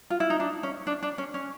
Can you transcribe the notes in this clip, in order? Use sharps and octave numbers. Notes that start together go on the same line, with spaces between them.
F4
E4
D#4
D4
C#4
D4
D4
C#4
C#4